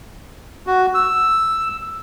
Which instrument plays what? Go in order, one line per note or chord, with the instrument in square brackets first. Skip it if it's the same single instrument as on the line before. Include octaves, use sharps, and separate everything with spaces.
[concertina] F#4
E6